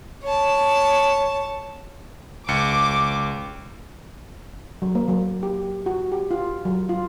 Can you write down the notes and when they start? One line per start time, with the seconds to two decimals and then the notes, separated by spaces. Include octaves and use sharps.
0.23 C#5 A5
2.49 C#2 D6 C#7
4.82 F#3
4.95 A#3
5.08 F#3
5.43 G4
5.86 F#4
6.12 G4
6.31 F4
6.65 F#3
6.89 F4